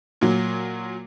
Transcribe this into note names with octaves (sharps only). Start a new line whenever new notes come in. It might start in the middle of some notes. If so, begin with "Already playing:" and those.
A#2 F#3